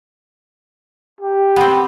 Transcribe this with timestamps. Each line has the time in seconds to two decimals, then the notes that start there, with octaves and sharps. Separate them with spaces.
1.21 G4
1.56 B3 C4